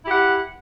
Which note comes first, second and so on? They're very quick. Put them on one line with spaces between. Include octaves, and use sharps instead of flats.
E4 G4 F#5